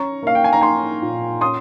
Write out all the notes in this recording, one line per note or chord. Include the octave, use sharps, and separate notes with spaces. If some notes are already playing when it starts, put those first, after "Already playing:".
Already playing: C#4 A#5 C#6
A#3 F5
G5
G#5
A#5
A#3 G#5 C6
A#2
C#4 C6 D#6